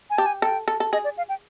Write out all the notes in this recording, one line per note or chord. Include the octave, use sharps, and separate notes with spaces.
G#5
G4 A5
G#5
A4 G5
A4
A4
G#4 D#5
D5
F5
G5